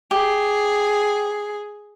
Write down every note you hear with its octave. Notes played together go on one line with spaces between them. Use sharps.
G4 G#4